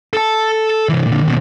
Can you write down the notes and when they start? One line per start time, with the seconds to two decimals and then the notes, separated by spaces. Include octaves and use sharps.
0.13 A4 A5
0.89 C3 E3
1.07 A#2 D3
1.23 D#2 B2